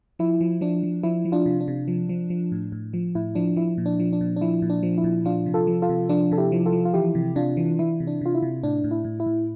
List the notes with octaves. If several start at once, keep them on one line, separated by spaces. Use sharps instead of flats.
F3 E4
F3
F3 D4
F3
F3 E4
F3
D4 F4
C3
D4
C3
F3
F3
F3
A2
A2
F3
A2 E4
F3 D4
F3 E4
A#2
D4
F3
D4
A#2
D4
F3 E4
A#2
D4
F3
E4
A#2
F3 D4 F4
C3
F4 A4
F3
F4 A4
C3
F3 D4 F4
C3 A4
E4 G4
F3
F4 A4
F3
F4
E3 E4 G4
C3
C3 D4 F4
E3
E3 E4
C3
D4
C3 F4
E4
C3
A2 D4
A2
E4
A2
E4
A2